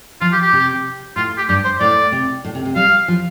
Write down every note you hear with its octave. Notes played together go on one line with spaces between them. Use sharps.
F3 F4
G4
G4
C3
A2 F4
G4
G2 G4
C5
A2 D5
C3
A2
C3
C3
G3 F5
F3